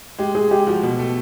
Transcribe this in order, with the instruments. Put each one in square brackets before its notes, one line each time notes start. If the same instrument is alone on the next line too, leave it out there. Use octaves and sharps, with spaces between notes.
[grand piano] G#3 [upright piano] G4
[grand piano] G#3 [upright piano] G#4
[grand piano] G#3 [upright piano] G4
[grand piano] F3 [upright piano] F#4
[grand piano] B2
A3